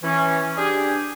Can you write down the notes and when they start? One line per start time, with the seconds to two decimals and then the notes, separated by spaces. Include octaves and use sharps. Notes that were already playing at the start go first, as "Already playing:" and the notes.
0.03 E3 C#4
0.58 D4 G4 G#4